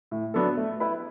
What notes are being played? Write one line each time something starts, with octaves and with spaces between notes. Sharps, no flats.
A2
F#3 B3 D4 A4
A3
E4 B4 E5